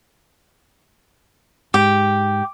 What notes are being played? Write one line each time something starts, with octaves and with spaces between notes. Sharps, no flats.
G#2 G4